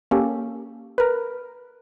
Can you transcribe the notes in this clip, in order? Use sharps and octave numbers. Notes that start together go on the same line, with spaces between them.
A#3 C#4 G4 A4
A#4 B4